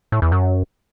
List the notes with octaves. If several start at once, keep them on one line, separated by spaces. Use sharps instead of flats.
A2
E2
F#2